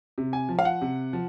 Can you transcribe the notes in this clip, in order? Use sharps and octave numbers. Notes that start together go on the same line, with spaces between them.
C3
G#5
F3
F5
F#5
C3
F3